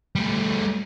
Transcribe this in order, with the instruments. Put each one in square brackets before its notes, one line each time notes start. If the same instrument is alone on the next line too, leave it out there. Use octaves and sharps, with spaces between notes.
[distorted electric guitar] G3 A3